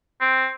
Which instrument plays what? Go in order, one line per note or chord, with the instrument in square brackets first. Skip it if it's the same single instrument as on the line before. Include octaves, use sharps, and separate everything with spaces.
[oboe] C4